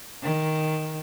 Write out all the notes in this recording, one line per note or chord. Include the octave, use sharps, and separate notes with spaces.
D#3